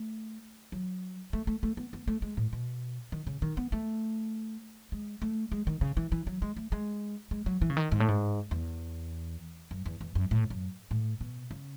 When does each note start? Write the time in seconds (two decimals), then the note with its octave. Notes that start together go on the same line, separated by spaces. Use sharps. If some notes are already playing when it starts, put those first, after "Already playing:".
Already playing: A3
0.72 F#3
1.33 A3
1.47 A3
1.63 A3
1.77 B3
1.93 B3
2.08 A3
2.22 G#3
2.37 A2
2.53 B2
3.12 D#3
3.27 C#3
3.42 D#3
3.57 B3
3.72 A3
4.92 G#3
5.22 A3
5.52 G#3
5.67 D#3
5.81 C#3
5.97 E3
6.12 E3
6.27 F#3
6.42 G#3
6.57 A3
6.72 G#3
7.31 G#3
7.46 F#3
7.62 E3
7.70 C#3
7.77 D#3
7.92 G#2
8.00 A2
8.08 G#2
8.51 E2
9.71 F#2
9.86 E2
10.01 E2
10.15 F#2
10.31 A2
10.50 F#2
10.91 A2
11.21 B2
11.51 C#3